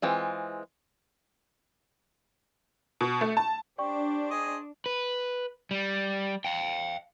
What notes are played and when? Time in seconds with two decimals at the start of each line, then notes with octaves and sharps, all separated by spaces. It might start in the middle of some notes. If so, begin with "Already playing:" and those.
0.02 E3 G#3 C4 F4
3.01 B2
3.21 A3
3.37 A5
3.78 D4 G4 C5 D5 G5 C#6
4.31 G#4 C5 D#5
4.86 B4
5.71 G3
6.45 F5 G5